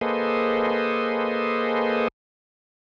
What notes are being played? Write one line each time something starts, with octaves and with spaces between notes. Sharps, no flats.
A#3 G#4 A4 B4 C5 D#5